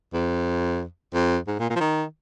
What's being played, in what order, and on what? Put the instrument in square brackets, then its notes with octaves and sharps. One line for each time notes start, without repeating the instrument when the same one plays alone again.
[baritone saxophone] F2
F2
G#2
A#2
A#2
F3
D#3